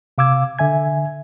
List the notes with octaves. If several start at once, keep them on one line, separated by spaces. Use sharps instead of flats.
C3 F5 D6 E6 G#6
D3 E5 G#5 G#6